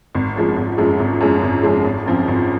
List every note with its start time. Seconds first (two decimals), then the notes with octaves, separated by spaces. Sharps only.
0.15 G#1
0.36 F#2 F3 G#3
0.56 G#1
0.78 F#2 F3 G#3
1.00 G#1
1.21 F#2 F3 G#3
1.43 G#1
1.63 F#2 F3 G#3
1.85 G#1
2.06 F#2 F3 C4 F4
2.28 G#1